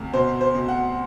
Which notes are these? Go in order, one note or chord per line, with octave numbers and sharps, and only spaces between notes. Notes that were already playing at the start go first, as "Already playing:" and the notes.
Already playing: D2 C3
B2 C5
C5
B2
F#5